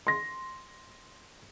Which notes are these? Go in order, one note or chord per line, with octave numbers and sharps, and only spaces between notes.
C6 A#6